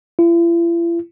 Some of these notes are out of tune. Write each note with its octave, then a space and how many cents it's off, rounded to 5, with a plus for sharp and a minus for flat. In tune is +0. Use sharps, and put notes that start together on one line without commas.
E4 +45